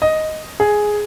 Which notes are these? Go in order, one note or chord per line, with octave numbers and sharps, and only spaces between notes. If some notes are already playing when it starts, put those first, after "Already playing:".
D#5
G#4